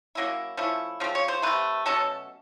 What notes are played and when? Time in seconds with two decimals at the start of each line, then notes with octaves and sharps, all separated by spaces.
0.15 F#3 A#3 C#4 E4
0.57 F3 A3 C#4 E4
1.00 C#3 F3 C4
1.15 C#5
1.28 C5
1.42 C3 F3 A3 B4
1.86 B2 F#3 A3 C#4 A4